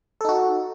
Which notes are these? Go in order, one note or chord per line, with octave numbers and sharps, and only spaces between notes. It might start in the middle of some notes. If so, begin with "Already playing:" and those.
D#4 F#4 A4